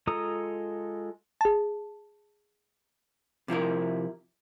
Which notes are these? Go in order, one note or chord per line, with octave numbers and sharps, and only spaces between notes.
G#3 F4 A4 A#5 D#6
G#4 A5
C3 F3 E4 A#4